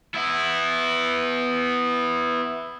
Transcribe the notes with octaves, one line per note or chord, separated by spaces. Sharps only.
B3 E4